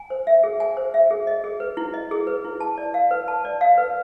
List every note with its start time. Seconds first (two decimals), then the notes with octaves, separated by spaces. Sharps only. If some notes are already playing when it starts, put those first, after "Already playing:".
Already playing: G#5
0.10 C5
0.27 E5
0.44 G#4
0.60 G#5
0.77 C5
0.94 E5
1.11 G#4
1.27 D#5
1.44 G#4
1.60 B4
1.77 E4
1.94 D#5
2.11 G#4
2.27 B4
2.45 E4
2.60 A5
2.78 D5
2.94 F5
3.11 B4
3.28 A5
3.45 D5
3.61 F5
3.78 B4